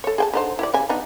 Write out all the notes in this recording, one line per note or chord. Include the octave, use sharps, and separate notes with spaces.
A4 C#5
G#4 G5 A5
D3 D#4 C5
E4 G4 D5
C#3 G3 G#5
B3 D4 D#4